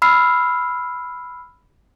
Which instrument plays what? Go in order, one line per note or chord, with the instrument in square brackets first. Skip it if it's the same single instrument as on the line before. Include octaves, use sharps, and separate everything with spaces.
[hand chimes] B5 E6 F6 C7